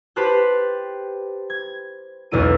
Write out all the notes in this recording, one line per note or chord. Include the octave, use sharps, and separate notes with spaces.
G4 B4 C5 A5 F#6
G#6
E1 B1 E2 E4 D#7